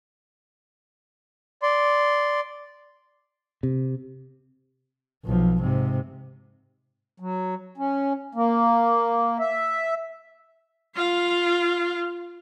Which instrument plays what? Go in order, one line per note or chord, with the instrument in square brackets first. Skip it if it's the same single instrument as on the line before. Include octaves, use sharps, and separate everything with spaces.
[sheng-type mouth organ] D5 C6
[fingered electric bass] C3
[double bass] B1 F3
G#2 C3
[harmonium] F#3
C#4
A#3
E5
[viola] F4 F5